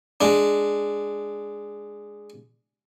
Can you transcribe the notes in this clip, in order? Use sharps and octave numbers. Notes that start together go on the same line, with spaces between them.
G#3 D4